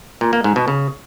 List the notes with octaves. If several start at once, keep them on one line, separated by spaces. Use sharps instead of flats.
A#2
A#3
G#2
B2
C#3